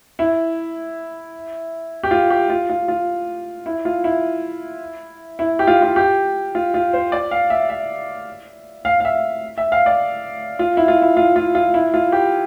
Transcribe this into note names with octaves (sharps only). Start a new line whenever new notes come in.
E4
G4
F4
G4
F4
F4
F4
E4
F4
E4
E4
G4
F4
F4
G4
F4
F4
C5
D5
F5
E5
E5
F5
F5
E5
E5
F5
D5
F4
E4
F4
E4
F4
F4
F4
E4
F4
G4